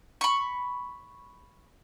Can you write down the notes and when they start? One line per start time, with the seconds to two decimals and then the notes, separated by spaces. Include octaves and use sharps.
0.21 B5 C#6